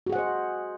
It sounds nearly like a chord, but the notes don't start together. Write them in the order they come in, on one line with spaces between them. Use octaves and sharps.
F#4 G#4 F#5 C5 D#5